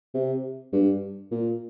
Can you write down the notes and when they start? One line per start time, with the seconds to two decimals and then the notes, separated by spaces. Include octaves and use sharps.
0.14 C3
0.73 G2
1.31 A#2